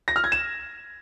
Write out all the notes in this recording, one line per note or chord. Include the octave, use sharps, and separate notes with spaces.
A#6
F6
G#6
E7